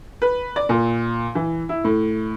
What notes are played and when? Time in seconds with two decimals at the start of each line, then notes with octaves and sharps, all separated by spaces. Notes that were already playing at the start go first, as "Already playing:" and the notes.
0.22 B4
0.56 D5
0.69 A#2
1.35 E3
1.69 E4
1.85 A2